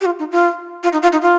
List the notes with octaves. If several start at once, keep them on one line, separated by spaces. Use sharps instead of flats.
G4
F4
D#4
F4
F4
D#4
F4
D#4
F4